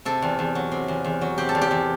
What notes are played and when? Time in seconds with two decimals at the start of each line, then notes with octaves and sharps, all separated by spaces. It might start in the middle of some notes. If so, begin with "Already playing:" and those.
0.05 C3 A4
0.22 E2
0.39 E2
0.55 F#3
0.72 C3
0.88 E2
1.04 E2
1.22 F#3
1.38 C3 G4
1.49 A4
1.55 E2
1.61 G4
1.71 E2